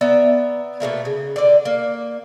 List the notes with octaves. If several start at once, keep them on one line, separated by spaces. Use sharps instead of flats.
B3 D5 E5 A#5
B2 F#3 A3 A#3
C#3
D3 D5
A#3